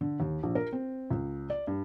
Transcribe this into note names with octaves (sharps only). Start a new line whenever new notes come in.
D3
D#2
A#1
A#4
C4
C#2
D5
G2